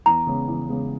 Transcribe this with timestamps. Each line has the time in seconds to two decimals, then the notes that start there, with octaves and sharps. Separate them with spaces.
0.06 E2 A#5
0.27 C#3 G#3 B3
0.48 E2
0.69 C#3 G#3 B3